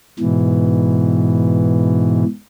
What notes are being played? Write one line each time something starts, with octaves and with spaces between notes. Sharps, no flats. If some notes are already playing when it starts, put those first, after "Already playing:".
G#2 B2 E3